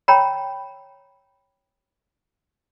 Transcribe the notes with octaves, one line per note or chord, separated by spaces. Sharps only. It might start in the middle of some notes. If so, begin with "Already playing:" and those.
C#5 G5 A#5 B5